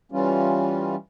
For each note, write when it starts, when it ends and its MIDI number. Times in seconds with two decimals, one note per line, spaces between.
0.12 0.95 52
0.12 0.95 55
0.12 0.95 61
0.12 0.95 65